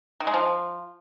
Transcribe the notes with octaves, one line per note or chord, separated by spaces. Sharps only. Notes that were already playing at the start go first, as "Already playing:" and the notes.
D#3
G#3
F3